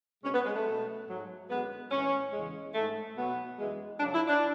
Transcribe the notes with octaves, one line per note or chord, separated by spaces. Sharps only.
B2 G#3 C#4
B3
G#3
A3
B2 F#3
G#2 F#3
F#2 D3 G#3 B3
A2 E3 G#3 C#4
E2 C#3 G#3
G#2 G#3 A3
B2 F#3 B3
F#2 E3 G#3
F#2 C#3 F#3 D4
E4
D4